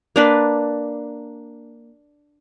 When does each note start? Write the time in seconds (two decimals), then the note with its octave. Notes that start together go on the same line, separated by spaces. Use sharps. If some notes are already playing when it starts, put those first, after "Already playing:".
0.16 A#3 D4 B4